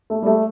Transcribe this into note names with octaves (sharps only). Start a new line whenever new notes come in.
A3
G3
A3